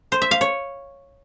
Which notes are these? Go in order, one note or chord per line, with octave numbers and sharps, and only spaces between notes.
C5
E5
F5
C#5